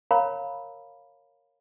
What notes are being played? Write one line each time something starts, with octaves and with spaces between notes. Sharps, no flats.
A#4 C#5 F5 A#5 B5